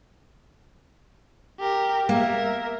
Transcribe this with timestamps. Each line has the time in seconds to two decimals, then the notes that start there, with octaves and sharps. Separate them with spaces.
1.60 G4 A#4
2.09 A#3 A#4 E5